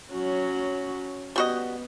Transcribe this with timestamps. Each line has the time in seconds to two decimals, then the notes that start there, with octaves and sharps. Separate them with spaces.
0.12 F#3 C#4 F#4
1.36 G3 B3 F#4 D#5